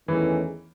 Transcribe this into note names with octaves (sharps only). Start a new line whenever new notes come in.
E2 D#3 E3 A3 C#4 G#4